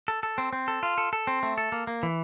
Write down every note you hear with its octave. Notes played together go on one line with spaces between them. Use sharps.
A4
A4
C4
C4
A4
F4
A4
A4
C4
A3
A4
A#3
A#3
E3